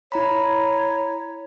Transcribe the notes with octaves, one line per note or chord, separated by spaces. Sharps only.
E4 C#5 A#5 B5